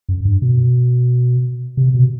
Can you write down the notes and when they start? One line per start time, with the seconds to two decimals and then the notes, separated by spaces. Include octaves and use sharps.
0.09 F#2
0.25 G2
0.42 B2
1.77 C3
1.94 B2